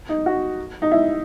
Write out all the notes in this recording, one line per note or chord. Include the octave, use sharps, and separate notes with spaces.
D#4
F#4
D#4
E4